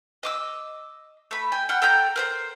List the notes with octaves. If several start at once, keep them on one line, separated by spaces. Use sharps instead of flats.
D#5 D6 E6
A3 B5
G5 G#5
F#5 G5 F6
A4 G5 A#5 G6
A#4 C5 G6